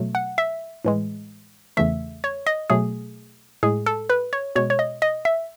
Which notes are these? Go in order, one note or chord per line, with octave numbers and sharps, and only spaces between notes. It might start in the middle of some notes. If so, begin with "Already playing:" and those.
Already playing: B2 F#3 A3
F#5
E5
A2 E3 G#3
E2 C#3 E3 A3 E5
C#5
D#5
B2 F#3 A3 G#4
A2 G#3 G#4
A4
B4
C#5
B2 G#3 C#5
C#5
D#5
D#5
E5